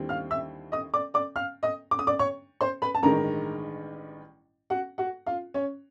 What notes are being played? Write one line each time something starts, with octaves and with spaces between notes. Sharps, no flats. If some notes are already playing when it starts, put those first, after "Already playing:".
Already playing: D#2 D3 G3 C4 E4
F5 F6
E5 E6
D#5 D#6
D5 D6
D5 D6
F5 F6
D#5 D#6
D6
D#6
D5 D6
C#5 C#6
C5 C6
B4 B5
A5
A1 G2 D#3 G#3 A#4 A#5
F#4 F#5
F#4 F#5
F4 F5
C#4 C#5